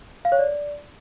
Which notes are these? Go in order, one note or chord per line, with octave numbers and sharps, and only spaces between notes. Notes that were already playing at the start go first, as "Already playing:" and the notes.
F5
C#5
D5